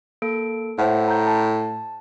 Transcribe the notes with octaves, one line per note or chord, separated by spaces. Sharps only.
A#3 A4 D7
A2 C5 E5 F#5
A#5 G6
A5